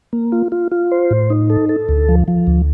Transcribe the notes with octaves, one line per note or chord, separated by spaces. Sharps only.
A#3
F4
F4
F4
C5
A2
D#4
A4
A4
D2
F3
F3
D2